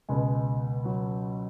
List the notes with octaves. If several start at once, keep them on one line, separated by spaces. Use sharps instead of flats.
C#2 B2 G#3
F#3